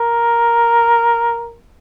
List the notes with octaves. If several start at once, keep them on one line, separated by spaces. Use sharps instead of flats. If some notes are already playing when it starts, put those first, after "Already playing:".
Already playing: A#4